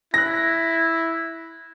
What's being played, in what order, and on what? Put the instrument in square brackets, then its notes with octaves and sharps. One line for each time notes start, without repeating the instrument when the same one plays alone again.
[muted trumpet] E4 [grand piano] F#6 A#6